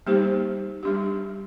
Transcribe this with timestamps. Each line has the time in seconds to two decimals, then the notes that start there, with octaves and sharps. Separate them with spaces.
0.07 G3 A#3 D#4 G4 C5
0.83 G3 D4 G4